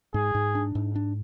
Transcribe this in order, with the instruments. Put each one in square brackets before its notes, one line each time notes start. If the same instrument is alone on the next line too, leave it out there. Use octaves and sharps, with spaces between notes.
[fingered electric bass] G#2 [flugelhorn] G#4
[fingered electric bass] G#2
D4
G#2
D4